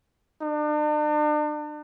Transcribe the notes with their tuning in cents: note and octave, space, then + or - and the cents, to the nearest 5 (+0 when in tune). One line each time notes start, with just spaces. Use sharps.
D4 +40